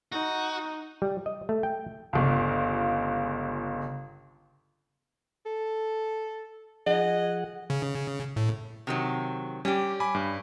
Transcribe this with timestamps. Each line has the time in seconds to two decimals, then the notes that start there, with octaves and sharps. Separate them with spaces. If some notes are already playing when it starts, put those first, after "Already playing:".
0.12 D#4 F#4
1.02 G3
1.26 D#5
1.49 A3
1.63 G5
2.13 G1 C#2
5.46 A4
6.86 F3 G#4 D#5 F#5
7.70 C#3
8.36 A2
8.87 C3 D#3 F#3
9.65 G3 C#4 G4
10.00 G#5 B5 D6
10.15 G2